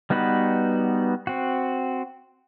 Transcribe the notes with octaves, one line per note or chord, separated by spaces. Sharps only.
G3 B3 D#4 F#4 B4
C4 F#4